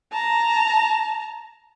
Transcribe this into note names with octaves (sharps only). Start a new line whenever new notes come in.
A5 A#5